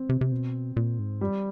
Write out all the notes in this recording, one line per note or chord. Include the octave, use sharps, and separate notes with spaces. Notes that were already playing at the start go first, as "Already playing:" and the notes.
Already playing: C4
C3
C3
B2
A#2
G#2
G2 G3